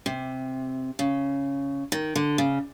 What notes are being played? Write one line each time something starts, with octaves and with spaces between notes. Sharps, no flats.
C3
C#3
D#3
D3
C#3